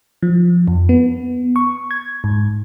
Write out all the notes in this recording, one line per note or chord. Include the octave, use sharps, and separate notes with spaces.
F3
F2
B3
C#6
G#6
G#2